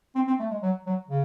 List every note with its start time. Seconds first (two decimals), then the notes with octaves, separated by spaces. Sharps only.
0.15 C4
0.27 C4
0.40 A3
0.50 G#3
0.62 F#3
0.86 F#3
1.09 C#3